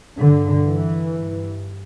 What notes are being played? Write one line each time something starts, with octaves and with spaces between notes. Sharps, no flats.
G2 D3
E3
G2